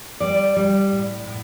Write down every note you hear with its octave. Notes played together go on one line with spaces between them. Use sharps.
G3 D5
G3
A2
A2